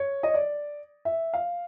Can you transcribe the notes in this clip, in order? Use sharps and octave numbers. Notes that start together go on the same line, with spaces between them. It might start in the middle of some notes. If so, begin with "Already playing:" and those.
Already playing: C#5
D#5
D5
E5
F5